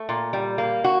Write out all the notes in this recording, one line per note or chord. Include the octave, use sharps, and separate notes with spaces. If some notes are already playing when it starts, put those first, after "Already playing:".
Already playing: A3
A#2
G3
A#3
F#4